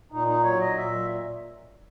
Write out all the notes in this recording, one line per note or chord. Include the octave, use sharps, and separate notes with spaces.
A#2 D#4
D#4
F#3 C#5
D#5
A#2 E5